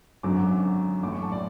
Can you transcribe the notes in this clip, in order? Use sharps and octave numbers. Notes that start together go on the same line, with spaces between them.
G#1 F#2 D3 F#3 D6
A1 A2 F#3 D6
C#6
A5
D5